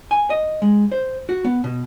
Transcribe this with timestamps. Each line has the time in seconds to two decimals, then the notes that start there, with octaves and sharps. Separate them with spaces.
0.11 G#5
0.30 D#5
0.62 G#3
0.92 C5
1.29 F#4
1.44 B3
1.64 B2